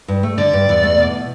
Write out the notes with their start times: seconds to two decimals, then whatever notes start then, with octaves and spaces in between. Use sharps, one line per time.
0.08 G2
0.23 A3
0.38 D3 D5
0.53 G2
0.69 E2
0.83 A3
0.98 B2